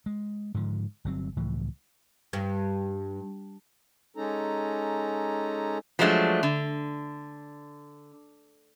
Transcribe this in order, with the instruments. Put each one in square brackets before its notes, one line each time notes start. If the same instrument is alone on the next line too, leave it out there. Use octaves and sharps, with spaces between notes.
[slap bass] G#3
G#2 D3 F3
G1 F#3 C4
C#2 A2 E3 F3
[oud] G2
[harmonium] G#3 C#4 D#4 A4 A#5
[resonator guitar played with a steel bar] F3 F#3 G#3 A3 D4
D3